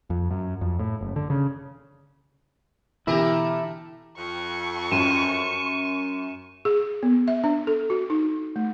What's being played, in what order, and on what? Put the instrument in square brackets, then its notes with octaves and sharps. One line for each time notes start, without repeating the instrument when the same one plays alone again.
[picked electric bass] F2
F#2
F2
A2
F#1
D3
C#3
[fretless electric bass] B2 D3 [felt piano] E3 [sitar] A3 G4 A#4 [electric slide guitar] E4
[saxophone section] F2 [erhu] C#6
[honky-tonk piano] F#2 [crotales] D#7 E7
[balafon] G#4
B3
E5
D4
A4
F#4
D#4
A3